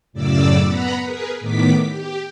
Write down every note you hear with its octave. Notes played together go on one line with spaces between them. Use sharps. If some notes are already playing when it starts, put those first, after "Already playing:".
F#2 A2 C#3 D5 D6 E6
B3 F#5 A#5 B5
G#4 A#4 B4
A2 D#3 B3 D6 B6
G4